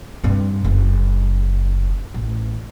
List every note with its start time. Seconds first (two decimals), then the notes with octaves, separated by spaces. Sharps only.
0.24 G2 C4
0.65 F#1
2.14 A1